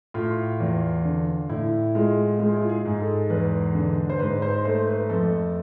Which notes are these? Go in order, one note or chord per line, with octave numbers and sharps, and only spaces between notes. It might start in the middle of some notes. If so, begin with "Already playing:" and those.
A2 F4
E2
D3
A2 E4
G#3 F4
G#3 F4
E4
F4
G#4
G#2
A4
E2 B4
D3
C5
G#2 B4
C5
A3 C5
B4
F2 A4